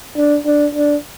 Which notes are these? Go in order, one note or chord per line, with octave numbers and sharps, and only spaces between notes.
D4
D4
D4